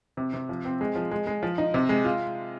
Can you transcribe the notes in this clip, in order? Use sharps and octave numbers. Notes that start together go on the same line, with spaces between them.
C3
C3
F3
C4
G#3
F3
G#3
G#3
F3
D#4
C3
G#3
F4